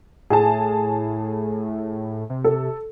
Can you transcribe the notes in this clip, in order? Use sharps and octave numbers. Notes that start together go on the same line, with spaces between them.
A2 G#4 G#5 A5
C3
A4